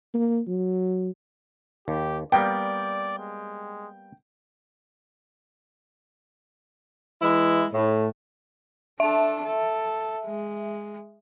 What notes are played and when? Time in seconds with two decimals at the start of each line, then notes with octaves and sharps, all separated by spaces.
0.14 A#3
0.47 F#3
1.88 D#2 G4
2.32 G3 A#3 B3 D5 G5
3.19 G#3
7.21 E3 G#3 E4
7.73 A2
9.00 D4 A4 E5
9.44 A4
10.25 G#3